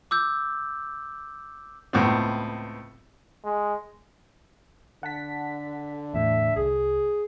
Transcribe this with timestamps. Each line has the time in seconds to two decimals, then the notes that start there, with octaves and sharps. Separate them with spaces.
0.11 D6 E6 G6
1.93 C#2 A2 B3 C4
3.44 G#3
5.03 D3 F#5 A5 B6
6.14 E2 A2 E5
6.56 C2 G#4